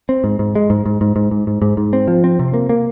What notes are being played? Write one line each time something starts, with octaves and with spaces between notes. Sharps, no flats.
C4
G#2
G#2
G#3
G#2
G#2
G#2
G#2
G#2
G#2
G#2
G#2
C4
F3
C4
C3
A#3
A#3